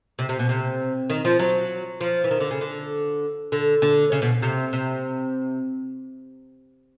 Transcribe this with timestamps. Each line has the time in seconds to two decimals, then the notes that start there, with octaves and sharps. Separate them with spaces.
0.19 C3
0.29 C3
0.39 B2
0.49 C3
1.10 D#3
1.25 F3
1.39 F#3
2.01 F3
2.24 E3
2.31 D#3
2.40 D3
2.51 C#3
2.61 D3
3.52 D3
3.82 D3
4.12 C#3
4.22 B2
4.42 C3
4.73 C3